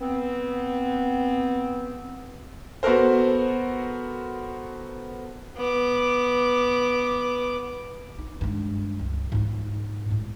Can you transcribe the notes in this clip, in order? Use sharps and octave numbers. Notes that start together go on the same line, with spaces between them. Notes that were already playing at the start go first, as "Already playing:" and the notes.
B3 C4
B3 F#4 A4 A#4 C5
B3 D6
D#4
G2 G#3
C#2
G#2 F4
A2 G#3